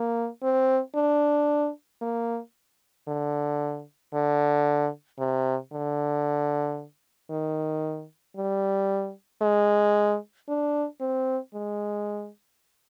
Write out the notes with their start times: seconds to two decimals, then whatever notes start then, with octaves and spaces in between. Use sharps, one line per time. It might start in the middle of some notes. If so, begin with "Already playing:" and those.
Already playing: A#3
0.43 C4
0.95 D4
2.02 A#3
3.08 D3
4.14 D3
5.19 C3
5.73 D3
7.30 D#3
8.37 G3
9.42 G#3
10.48 D4
11.01 C4
11.54 G#3